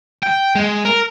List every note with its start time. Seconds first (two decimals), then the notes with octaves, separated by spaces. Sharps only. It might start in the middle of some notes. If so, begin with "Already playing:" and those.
0.23 G5
0.55 G#3
0.85 A#4